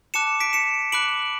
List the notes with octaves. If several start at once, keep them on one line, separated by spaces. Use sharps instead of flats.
A5 D6 F#6 C#7 E7
B6 D7
C#7 E7
B5 D6 F#6 D7 F#7